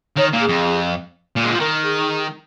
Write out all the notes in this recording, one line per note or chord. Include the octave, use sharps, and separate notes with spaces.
D#3 C#5
A#2
G#4
F2
A#2
G#3
F3
D#3 A#4
G#4